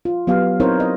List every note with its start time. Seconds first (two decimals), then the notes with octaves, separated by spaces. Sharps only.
0.05 F4
0.27 F#3 B3 G4 F5
0.60 C4 D#4 E4 A#4 C5 C#5
0.80 D#5